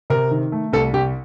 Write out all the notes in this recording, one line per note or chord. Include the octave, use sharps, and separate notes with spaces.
C3 A#4
D#3
A3
C2 A4
C2 G4